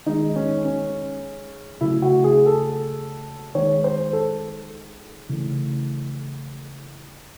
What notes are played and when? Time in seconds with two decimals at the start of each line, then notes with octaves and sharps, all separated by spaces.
0.06 D#3 G#3 D#4
0.36 C#4
0.65 C#4
1.81 C#3 F#3 A3 E4
2.02 F#4
2.24 G#4
2.46 A4
3.55 D#3 G#3 C#5
3.84 C5
4.13 A4
5.29 C#3 E3 A3